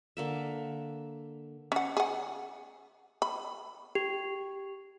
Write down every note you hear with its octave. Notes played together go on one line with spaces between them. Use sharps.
D3 A#3 E5
C#4 F#5
G#4 F#5
B5
G4